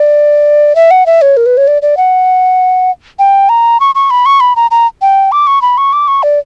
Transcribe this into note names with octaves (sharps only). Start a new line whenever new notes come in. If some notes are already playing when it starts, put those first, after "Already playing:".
Already playing: D5
E5
F#5
E5
C#5
A#4
B4
C#5
D5
D5
F#5
G5
A#5
C#6
C#6
B5
C#6
B5
A#5
A#5
G5
D6
C#6
B5
C#6
D6
C#6
D5